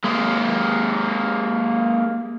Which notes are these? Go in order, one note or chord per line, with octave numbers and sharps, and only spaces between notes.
G#3 A#3